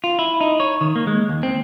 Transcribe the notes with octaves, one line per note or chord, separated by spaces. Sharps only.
F4
E4
D#4
C#5
D#3
A#3
G#3
D#2
C4